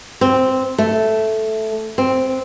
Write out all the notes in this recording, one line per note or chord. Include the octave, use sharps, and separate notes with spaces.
C4
A3
C4